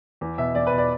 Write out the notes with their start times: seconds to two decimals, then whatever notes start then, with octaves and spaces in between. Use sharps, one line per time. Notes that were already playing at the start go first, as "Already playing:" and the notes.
0.21 E2
0.38 B2 E5
0.55 E2 D5
0.67 B4
0.72 B2
0.78 D5